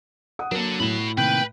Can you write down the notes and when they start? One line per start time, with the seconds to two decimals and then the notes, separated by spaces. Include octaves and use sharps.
0.39 F#5 D#6
0.52 F#3 A#3 D4 A4 A#4
0.80 A2 F#4 B5 E7
1.18 C3 D#3 A#3 B4 G5